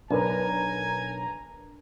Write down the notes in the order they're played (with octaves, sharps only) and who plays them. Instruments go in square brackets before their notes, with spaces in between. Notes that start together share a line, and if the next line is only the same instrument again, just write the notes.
[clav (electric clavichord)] B1 [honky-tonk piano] D4 A#4 B4 [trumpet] G#5 [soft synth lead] A#5